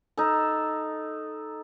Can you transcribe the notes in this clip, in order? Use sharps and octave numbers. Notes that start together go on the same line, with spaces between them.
D#4 A4